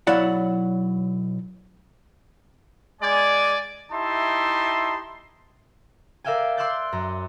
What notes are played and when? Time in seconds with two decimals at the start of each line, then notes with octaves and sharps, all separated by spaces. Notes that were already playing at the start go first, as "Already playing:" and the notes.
0.07 B1 F#3 E4 D5 F5 F#5
3.01 G#3 D5 G#5
3.92 D#4 E4 G4 E5 A5 C6
6.24 A#4 D5 E5 F5 G5 G#5
6.57 C6 D6 E6 F#6 G6 A6
6.92 F#2 A#5